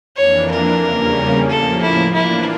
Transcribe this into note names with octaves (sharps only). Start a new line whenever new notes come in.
F2 E3 A#3 D4 C#5
A#4
E2 C#3 G3 A#3 C#4
A2 F3 A#3 A4
E4
E3 A#3 D4 E4 F4